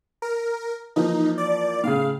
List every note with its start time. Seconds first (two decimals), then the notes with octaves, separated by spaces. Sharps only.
0.22 A#4
0.96 E3 F3 A#3 D#4
1.38 D5
1.84 A2 C#3 F5